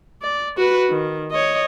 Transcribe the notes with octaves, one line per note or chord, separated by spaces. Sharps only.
D5
F#4 B4
D#3
C#5 D#5